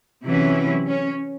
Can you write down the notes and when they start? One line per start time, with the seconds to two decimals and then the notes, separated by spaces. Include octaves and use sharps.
0.24 C3 E3 F#3 C#4 E4
0.86 C#4